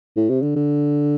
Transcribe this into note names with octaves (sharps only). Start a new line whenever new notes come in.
A2
C3
D3
D3